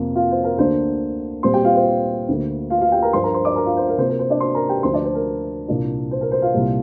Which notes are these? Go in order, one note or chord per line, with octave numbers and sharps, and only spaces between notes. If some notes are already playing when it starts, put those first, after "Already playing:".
Already playing: F2 C3 A#3 F4
F4 F5
C5
A#4
D2 D3 A#3 D4 C5
A#2 G3 C4 F4 C5 C6
G4 G5
F4 F5
C5
D2 D3 A#3
F4 F5
F4 F5
G4 G5
A#4 A#5
G2 F3 D4 F4 C5 C6
A#4 A#5
C5 C6
D5 D6
A#4 A#5
F4 F5
C5
A#4
C3 A#3 F4 C5
A#4
C5
D4 D5
C5 C6
A#4 A#5
G4 G5
D2 D3 F3 C5 C6
D4 D5
C5
A#4
C2 A#2 A#3 D4 F4
C5
A#4
C5
F4 F5
C2 A#2 G3